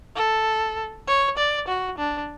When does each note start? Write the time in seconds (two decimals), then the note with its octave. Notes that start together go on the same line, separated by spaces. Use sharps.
0.16 A4
1.07 C#5
1.37 D5
1.68 F#4
1.98 D4